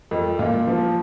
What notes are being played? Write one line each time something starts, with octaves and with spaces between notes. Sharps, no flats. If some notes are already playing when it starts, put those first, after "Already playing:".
F2
A#2 F4
F3